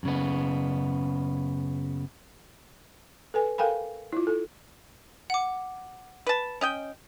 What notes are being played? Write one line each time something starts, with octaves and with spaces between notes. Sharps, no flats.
F#2 C#3 B3
A4 B4 G#5
A4 A#4 F5 G5 G#5 B5
E4 F4
A4
F#5 D6
B4 A5
C#4 D#5 G5